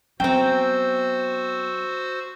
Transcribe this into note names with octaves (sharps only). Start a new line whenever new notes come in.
F#2 B3 C4 F#4 C5 G5 E6